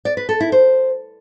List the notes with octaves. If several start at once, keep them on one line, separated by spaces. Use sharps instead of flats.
D5
B4
A4
E4
C5